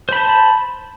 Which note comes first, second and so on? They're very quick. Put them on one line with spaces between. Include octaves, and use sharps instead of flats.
C5 B5 A5